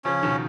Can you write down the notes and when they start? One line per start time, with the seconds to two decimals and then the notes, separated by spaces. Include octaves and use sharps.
0.05 C#3 F3 C#4
0.23 B2 D#3